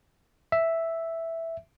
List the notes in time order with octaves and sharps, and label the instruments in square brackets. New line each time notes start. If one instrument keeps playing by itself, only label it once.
[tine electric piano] E5